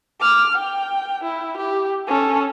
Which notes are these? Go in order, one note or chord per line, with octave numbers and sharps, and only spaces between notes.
D6 F6
G5
E4
G4
C#4 A4